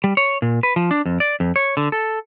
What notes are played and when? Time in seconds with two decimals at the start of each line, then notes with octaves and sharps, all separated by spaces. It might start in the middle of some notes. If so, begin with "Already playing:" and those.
0.04 G3
0.17 C#5
0.42 A#2
0.63 B4
0.76 F3
0.91 D4
1.06 F2
1.20 D5
1.40 F2
1.56 C#5
1.77 D3
1.92 A4